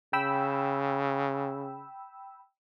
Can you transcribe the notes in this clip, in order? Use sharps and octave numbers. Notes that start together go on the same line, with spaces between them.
C#3 G5 B5 E6